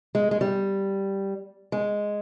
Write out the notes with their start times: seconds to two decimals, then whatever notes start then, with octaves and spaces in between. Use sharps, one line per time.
0.15 G#3
0.31 G#3
0.41 G3
1.72 G#3